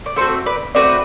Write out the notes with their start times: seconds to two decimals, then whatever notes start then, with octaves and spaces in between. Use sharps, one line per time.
0.06 D5
0.16 A3 C4 F#4 A4 C5
0.46 B4 D5
0.75 A3 C4 F#4 B4 D5